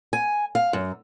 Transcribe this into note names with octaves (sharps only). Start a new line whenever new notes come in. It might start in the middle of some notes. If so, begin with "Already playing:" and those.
G#5
F5
F#2